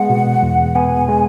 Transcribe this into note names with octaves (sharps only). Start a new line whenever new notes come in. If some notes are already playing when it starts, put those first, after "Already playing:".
Already playing: G#3 B3 F#5
B2
E2
B3 G#5
G#3